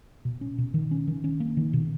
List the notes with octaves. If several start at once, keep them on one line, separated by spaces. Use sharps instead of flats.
B2
C#4
B2
D#3
C#4
D#3
C#4
A#3
D#3
B2